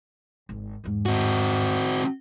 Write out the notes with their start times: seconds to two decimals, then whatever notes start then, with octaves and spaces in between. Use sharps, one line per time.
0.49 G#1
0.84 E2 G#2
1.06 C4 F#4